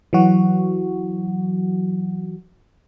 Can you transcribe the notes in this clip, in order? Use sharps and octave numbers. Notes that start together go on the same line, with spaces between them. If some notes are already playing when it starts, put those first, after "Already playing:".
E3 F#3 F#4